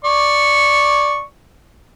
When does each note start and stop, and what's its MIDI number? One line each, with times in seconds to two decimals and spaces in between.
0.04 1.22 74
0.04 1.22 85